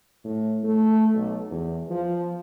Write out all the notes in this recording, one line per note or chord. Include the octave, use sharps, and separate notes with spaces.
A2
A3
B1
E2
F3